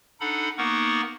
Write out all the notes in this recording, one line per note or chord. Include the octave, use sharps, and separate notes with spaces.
D4 D#4 A4 F#5 B5
A#3 B3 D#4 A#4 F#5 C#6